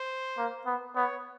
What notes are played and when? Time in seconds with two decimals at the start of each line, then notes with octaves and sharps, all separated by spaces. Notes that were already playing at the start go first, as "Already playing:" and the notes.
Already playing: C5
0.37 A#3
0.66 B3
0.96 B3 C#5